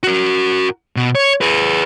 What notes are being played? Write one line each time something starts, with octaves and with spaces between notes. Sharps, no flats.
F#4 A#4
B2
C#5
G#4 B4